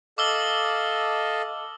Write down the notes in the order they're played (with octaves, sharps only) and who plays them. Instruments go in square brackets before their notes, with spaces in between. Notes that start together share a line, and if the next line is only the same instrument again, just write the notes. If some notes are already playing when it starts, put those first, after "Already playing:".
[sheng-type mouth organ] A4 D#5 F5 [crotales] D6 E6 G7